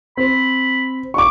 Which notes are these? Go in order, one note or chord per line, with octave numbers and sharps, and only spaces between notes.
C4 B5
C#6 D6